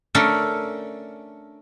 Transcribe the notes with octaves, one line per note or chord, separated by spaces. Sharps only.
A3 C#4 D4 A4 A#4